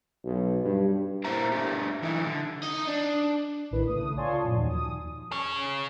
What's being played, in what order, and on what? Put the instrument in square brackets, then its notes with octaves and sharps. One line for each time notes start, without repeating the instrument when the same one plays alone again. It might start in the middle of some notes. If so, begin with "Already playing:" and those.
[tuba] B1
G2
[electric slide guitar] A#3 E4 A#4 C5 E5 A#5
A3 D4 G4
E3 D#4 E4
D3
[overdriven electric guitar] D#4 D#5
D4
[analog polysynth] A#1 A2 D#3 E4 B4
C#2 A3 D#6
F4 C#5 D5 G#5 A5 C6
F#2 A#2
D#2 F3 F#3 D#4 F#4
D#6
[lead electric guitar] G#4 C#5